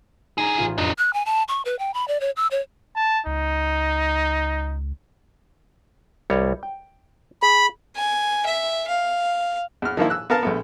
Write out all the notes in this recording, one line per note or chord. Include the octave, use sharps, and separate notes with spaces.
F#2 D#4 G#4 A#5
A1 F4
F2 D4 D#4
F#6
G#5
A5
C#6
B4
G5
B5
D5
C#5
E6
C#5
A5
C#2 D#4
C2 G3 C#5
G5
G#4 B5
G#5
E5
F5
E2 F6
D#3 F3 A#3 E4
E6 F#6
B3 A#4 F5 A5
A#1 A3 B3